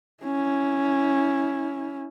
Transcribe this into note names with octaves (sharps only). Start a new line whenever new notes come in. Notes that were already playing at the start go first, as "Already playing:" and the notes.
C#4 E4